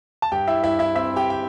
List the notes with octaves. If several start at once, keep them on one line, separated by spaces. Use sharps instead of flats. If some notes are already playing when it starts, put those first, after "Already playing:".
A5
G2 G4 G5
E4 E5
G2 E4 E5
E4 E5
C4 E4 E5
G4 G5
G5